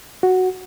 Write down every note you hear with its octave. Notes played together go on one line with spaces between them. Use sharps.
F#4